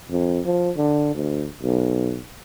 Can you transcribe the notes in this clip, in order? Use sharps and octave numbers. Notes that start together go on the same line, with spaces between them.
F2
F3
D3
D2
B1